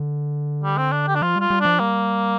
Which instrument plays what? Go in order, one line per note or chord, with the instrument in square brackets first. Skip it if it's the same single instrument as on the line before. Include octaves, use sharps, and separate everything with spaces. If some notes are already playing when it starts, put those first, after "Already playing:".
Already playing: [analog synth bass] D3
[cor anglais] G3
C4
D4
G4
D4
[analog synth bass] F3 [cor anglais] F4
[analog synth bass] G3 [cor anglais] F4
[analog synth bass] G3
[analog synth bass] F3 [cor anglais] D4
[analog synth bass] G3 [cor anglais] A#3